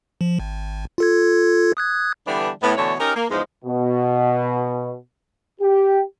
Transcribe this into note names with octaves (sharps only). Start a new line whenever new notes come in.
F3
G#1
F4 A4 G#6
D#6 F#6 G#6
D3 E3 G3 B3 D4
A2 B3
B2 D3 E3 A3 C#5
C#4 D#4 G4 A#4
A#3
E2 G#2 F3 G#3 C#4 D#4
B2
G4